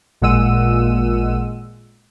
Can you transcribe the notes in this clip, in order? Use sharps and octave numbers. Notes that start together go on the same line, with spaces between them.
A1 A#2 G#3 F#5 E6 D#7